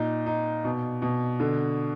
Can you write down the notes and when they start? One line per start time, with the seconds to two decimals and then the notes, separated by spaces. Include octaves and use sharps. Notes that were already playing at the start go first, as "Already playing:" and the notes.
Already playing: A#2 D#4
0.26 D#4
0.64 B2
1.02 B2
1.40 D3